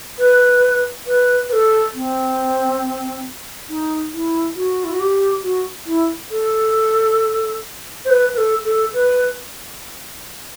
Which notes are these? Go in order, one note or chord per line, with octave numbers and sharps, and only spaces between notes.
B4
B4
B4
A4
C4
D#4
E4
F#4
E4
F#4
G4
F#4
E4
A4
C5
B4
B4
A4
A4
B4